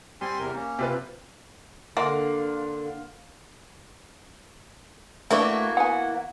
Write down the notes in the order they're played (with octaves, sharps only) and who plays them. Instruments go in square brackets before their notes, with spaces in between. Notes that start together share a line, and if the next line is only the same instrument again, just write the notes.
[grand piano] G3 [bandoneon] C4 G#5 C6
[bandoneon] E2 C3 A#4
A#3 C#4
[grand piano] C3 F4 B4
[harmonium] D3 [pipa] A#3 [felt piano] F5 F#5 C6
[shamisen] D3 B4 D5 [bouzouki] E3 A#3 F#4 [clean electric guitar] A3
[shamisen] B3 G#5 [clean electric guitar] F#5